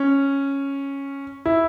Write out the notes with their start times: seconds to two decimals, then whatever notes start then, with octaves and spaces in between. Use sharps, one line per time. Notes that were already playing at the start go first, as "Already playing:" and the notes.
Already playing: C#4
1.46 E4